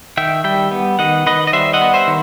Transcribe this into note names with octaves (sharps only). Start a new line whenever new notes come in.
D#3 E5 G5
G3 E5 G5
B3
D#3 D#5 F#5
D#3 B4 D#5
D#5
G3 C5 E5
D#5 F#5
B3
C5 E5
D#3